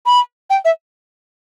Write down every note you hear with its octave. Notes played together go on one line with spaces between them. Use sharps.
B5
G5
E5